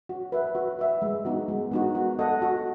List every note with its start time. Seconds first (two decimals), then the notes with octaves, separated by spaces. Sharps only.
0.09 F#4
0.32 B4 E5
0.55 F#4
0.79 B4 E5
1.02 G#3
1.25 B3 D#4 F#4
1.48 G#3
1.72 B3 D#4 F#4
1.95 F#4
2.19 A4 D#5 F#5
2.42 F#4